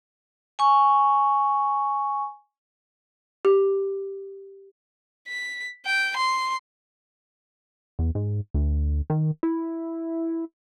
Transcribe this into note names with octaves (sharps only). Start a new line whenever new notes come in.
G#5 C#6
G4
B6
G5
C6
E2
G#2
D2
D#3
E4